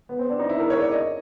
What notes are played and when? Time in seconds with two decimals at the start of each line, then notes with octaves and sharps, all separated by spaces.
0.09 B3
0.19 C4
0.29 D4
0.39 D#4
0.49 E4
0.60 A#4
0.70 C#5
0.81 D5
0.91 D#5